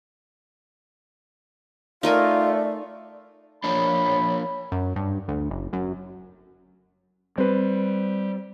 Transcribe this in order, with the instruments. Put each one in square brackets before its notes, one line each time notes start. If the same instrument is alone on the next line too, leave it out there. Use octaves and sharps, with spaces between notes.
[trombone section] A3 [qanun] D#4 A#4 G#5 [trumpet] F4 [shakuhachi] D5
[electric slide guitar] F3 A#3 D4 [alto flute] C#5 [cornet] B5
[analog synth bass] F#2
G2
D2
F#1
F#2
[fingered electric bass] G3 [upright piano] C4 B4